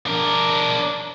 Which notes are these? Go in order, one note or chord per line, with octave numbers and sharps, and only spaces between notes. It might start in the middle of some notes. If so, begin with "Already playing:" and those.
D4 A#4